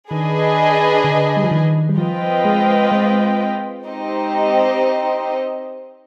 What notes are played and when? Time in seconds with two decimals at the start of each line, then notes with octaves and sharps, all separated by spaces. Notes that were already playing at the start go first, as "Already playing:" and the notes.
0.10 D#3 D4 G#4 B4 D#5 G#5
1.04 D3
1.37 G3
1.44 F3
1.51 D#3
1.89 G3
1.98 F3 C4 F4 B4 D#5 G5
2.45 G#3
2.92 G#3
3.86 C4 D#4 G4 C5 D#5